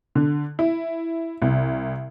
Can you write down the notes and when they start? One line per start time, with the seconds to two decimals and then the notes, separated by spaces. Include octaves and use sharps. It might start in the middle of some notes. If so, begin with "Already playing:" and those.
0.15 D3
0.59 E4
1.42 C2